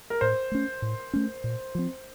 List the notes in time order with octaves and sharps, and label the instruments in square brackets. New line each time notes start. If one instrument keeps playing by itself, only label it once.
[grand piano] A#4
[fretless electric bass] A2 [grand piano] C5
[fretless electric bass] A3 C#4
A2
A3 C#4
A#2
F3 C4